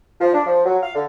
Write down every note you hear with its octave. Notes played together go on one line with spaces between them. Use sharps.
F3
D4
F3
F#3
F5
D3